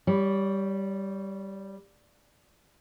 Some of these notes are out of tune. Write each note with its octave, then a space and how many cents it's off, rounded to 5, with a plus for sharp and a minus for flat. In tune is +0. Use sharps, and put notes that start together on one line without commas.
G3 +0 C#5 +30